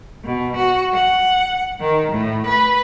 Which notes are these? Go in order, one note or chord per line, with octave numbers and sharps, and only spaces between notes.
B2
F#4
F#5
D#3
A2
B4